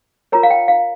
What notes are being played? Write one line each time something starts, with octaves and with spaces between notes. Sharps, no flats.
F4 A#4 C#5 A#5
F5
G5
F5